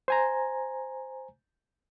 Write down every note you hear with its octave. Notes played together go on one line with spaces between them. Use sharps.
C5 G#5 A#5